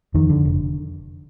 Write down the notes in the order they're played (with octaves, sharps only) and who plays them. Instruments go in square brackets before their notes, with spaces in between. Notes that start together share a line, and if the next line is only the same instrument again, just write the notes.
[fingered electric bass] F2 D#3
D3
F1